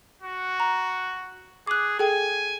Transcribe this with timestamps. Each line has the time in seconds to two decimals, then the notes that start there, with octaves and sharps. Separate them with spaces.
0.22 F#4
0.60 A#5
1.67 G#4 D6 F#6
1.99 G#4 A4 G5 G#5